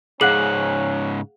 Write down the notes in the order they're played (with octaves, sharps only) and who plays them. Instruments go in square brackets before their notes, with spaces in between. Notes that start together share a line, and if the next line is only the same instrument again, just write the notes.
[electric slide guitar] G#2 C#3 [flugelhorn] C#4 [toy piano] G#4 F5 F#5 [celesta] F#6 F#7